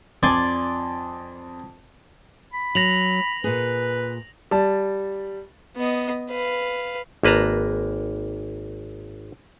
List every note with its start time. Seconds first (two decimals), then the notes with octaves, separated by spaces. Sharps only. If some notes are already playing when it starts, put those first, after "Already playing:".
0.23 F2 D5 G#5 C6
2.53 B5
2.75 F#3 A#6 F7 F#7
3.44 A#2 G#4 B4
4.51 G3 A5
5.76 B3 D#5
6.30 B4 F5
7.23 G#1 A#3 B4 A5 A#5